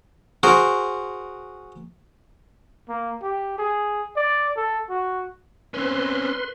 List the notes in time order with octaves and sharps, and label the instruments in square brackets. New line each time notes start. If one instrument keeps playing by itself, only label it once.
[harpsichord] F#4 G#4 A#4 C5
[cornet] A#3
G4
G#4
D5
A4
F#4
[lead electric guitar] C4 C#4 [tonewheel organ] B4 C6